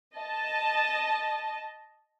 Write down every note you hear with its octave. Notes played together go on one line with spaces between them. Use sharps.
D#5 A5